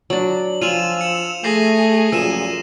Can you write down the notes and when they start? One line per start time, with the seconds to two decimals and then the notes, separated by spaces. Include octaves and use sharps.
0.10 F#3 D4 F#7
0.62 F3 F4 G#5 E6 D#7 F7 F#7
1.01 C#7 E7
1.44 A3 G#4 A#6 C7 F#7
2.12 F#2 A#2 F3 E6 D#7 E7